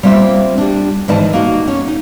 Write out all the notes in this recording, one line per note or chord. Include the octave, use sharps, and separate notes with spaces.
G3 A#3 C4 F4 E5
G3 D4
G#2 D#3 E3 D5 D#5 A5
A#3 D#4 F#4
C#4
D#4